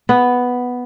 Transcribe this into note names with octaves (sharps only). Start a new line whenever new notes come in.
B3